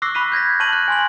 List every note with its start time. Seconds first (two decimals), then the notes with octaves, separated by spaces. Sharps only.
0.02 C#6 D6 E6 F#6 A#6 C7
0.15 B5 C#6 F#6 B6 D#7
0.32 G6 G#6 A#6 B6
0.60 A5 C#6 F6 A#6 D#7 F#7
0.73 F#6
0.88 G#5 C6 F#7